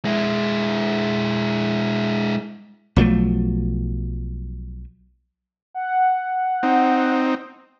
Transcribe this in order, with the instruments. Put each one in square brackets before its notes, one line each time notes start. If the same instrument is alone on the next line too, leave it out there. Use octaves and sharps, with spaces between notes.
[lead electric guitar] G#3 E4
[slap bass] B1 F3 F#3 A3
[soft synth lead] F#5
[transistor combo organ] C4 D#4